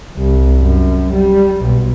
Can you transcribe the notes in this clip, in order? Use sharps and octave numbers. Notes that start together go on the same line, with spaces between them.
C2
F#2
G3
B1